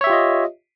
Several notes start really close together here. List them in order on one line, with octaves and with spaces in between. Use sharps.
C#5 E5 G4 F4 D#5